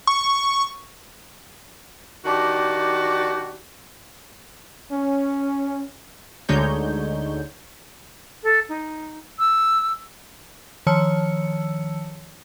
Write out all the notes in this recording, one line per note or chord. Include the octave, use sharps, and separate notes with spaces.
C#6
D#3 D4 F#4 G4
C#4
D2 D3 G#3 D#4 C#5 G6
A4
D#4
E6
D#3 F3 C#5 A5 E6 C#7